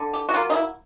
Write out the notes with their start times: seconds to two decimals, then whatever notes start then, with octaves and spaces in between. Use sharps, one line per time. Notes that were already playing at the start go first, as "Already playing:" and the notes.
Already playing: D3
0.13 G4
0.29 F#4
0.34 F#3 A#3 F4
0.50 D#4
0.54 E4